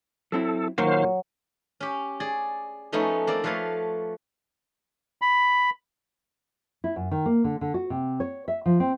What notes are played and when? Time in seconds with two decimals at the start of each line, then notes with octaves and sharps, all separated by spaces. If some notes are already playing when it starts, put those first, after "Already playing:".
0.32 F#3 C4 E4 A4
0.78 A#2 D#3 F#3 A#3 C5 F5
1.80 C#4 G4
2.20 G#4 D5
2.92 F3 A3 B3 C#4 D#4
3.27 A#3 C4 D5
3.44 F3 A3 B4 C#5 F5
5.22 B5
6.84 E4
6.96 F#2
7.11 D#3
7.26 A#3
7.44 D3
7.61 D3
7.74 F#4
7.90 C3
8.20 C#5
8.48 E5
8.66 F3
8.80 C4